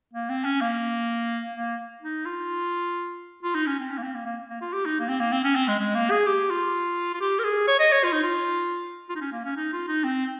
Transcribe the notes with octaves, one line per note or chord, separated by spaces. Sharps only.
A#3
C4
C#4
A#3
A#3
D#4
F4
F4
D#4
C#4
C4
C#4
A#3
C4
A#3
A#3
A#3
F4
G4
D#4
A#3
C4
A#3
C4
C#4
C4
G#3
G#3
A#3
G#4
G4
F4
F4
G4
A#4
G#4
C#5
D#5
C#5
F4
D#4
F4
F4
D#4
C#4
A#3
C#4
D#4
F4
D#4
C4